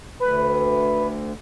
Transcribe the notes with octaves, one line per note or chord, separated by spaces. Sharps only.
D2 B4